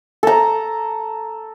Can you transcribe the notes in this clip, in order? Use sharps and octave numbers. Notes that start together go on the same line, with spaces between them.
A4 A#5